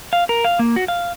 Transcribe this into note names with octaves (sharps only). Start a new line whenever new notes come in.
F5
A#4
F5
A#3
F#4
F5